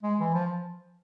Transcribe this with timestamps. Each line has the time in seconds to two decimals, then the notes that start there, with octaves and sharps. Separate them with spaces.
0.03 G#3
0.20 E3
0.34 F3